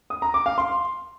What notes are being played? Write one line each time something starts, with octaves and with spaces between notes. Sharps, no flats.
D#6
A#5
D6
F5
C6